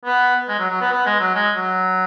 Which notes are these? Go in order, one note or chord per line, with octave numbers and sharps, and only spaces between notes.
B3
G#3
F#3
F#3
B3
B3
G#3
F#3
G#3
F#3